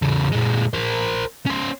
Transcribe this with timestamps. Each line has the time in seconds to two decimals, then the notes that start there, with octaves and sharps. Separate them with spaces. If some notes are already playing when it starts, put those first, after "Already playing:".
0.02 E2 C#3
0.32 A#2 G#3
0.74 A#4 C5
1.46 C#4 C5